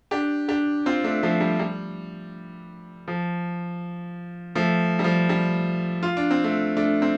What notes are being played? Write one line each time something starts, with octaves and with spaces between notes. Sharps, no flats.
D4 G4
D4 G4
C4 F4
A3 D4
F3 A3
G3
G3
F3
F3 A3
G3
F3
G3
F4
D4
C4
A3 D4
A3 D4
C4